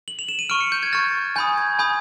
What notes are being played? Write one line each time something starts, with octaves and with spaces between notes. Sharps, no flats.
F#7
F7
E7
D#7
C#6 F6 D7
C#7
G6
G#6
C#6 F6 A6
G#5 B5 D#6 G6
G#6
G#5 B5 D#6 G6